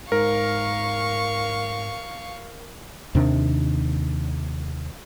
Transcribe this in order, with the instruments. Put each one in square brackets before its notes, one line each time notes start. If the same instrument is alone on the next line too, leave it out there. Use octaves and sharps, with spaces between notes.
[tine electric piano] G#2 [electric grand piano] A#4 [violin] F5 C#6
[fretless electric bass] D#2 C3 D#3 D4